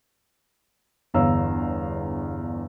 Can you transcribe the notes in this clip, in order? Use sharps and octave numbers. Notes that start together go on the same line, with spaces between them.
G1 E2 C#5 F5 A#5 E6